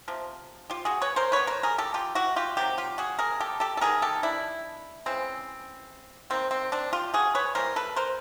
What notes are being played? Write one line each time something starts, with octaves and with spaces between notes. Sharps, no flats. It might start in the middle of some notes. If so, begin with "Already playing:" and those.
C3 F3
F4 G4
F#4 G#4
B4 C#5
A#4 C5
D3 G3 B3 B4 C#5
A#4 C5
G#4 A#4
G4 A4
F4 G4
E4 F#4
F4 G4
C3 D#3 F#3 G4
F4 G4
F#4 G#4
G#4 A#4
G4 A4
G4 A4
A4
D#3 G3 B3 G#4 A#4
G4 A4
D4 E4
C#3 E3 G#3 C4
D#3 G3 A#3 C4
C4
C4 D4
F4 G4
F#4 G#4
B4 C#5
E3 G3 A#3 A#4 C5
A4 B4
A#4 C5